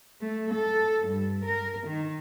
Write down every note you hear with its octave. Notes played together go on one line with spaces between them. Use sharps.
A3
A4
G2
A#4
D#3